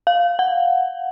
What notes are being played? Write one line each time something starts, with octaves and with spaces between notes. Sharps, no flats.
F5
F#5